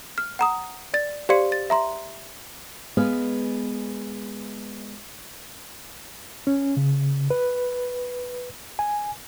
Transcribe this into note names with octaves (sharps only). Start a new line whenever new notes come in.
F6
F#5 A#5 D#6
D5 A6
G4 C5 D5 F5 C6 C#7
A6
E5 A#5 C6
G#3 B3 G#4 B4 F5
C#4
C#3
B4
G#5